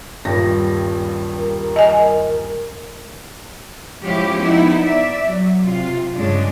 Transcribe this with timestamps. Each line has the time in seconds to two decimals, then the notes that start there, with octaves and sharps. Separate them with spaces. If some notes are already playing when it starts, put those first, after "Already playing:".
0.25 D#1 G2 A#6
1.38 A#4
1.76 D#5 G#5
4.02 F3 G#3 C#4 E4 G4
4.40 B3 D#4 E4
4.81 D5 E5
5.28 F#3
5.62 C3 F4
6.15 G2 C#3 G#3 D4